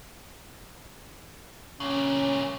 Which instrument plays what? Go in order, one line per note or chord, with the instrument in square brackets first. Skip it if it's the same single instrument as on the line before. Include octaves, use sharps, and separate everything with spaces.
[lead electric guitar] A#2 C#3 [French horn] C#4